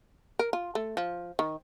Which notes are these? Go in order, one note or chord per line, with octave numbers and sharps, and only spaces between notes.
A#4
F4
A3
F3
D#3